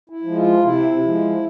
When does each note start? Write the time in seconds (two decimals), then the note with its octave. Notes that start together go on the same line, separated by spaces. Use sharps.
0.10 E4
0.23 F3 G#3
0.36 F4
0.62 C3 E4
1.02 F3 G#3